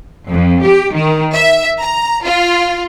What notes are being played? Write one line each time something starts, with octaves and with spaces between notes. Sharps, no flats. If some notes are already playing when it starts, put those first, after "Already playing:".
F2
G4
D#3
E5
A#5
F4